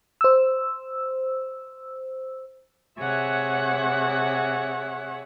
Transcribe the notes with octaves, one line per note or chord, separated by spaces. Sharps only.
C5 E6
C3 G#4 C#5 E5 F#5 F#6